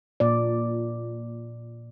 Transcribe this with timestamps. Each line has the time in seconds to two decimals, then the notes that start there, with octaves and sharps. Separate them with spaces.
0.20 A#2 D5